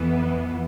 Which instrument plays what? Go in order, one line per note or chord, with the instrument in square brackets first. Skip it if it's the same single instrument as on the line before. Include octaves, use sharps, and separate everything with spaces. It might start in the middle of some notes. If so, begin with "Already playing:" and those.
Already playing: [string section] F2 E3 B3